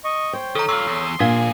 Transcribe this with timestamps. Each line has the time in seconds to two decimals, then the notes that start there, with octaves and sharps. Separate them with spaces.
0.04 D#5 C#6
0.33 C5 C#5 G5
0.55 D#3 A4 A#5
0.69 G2 F4 C6 C#6 E6
0.87 E2
1.20 A#2 F3 D4 F5 G#5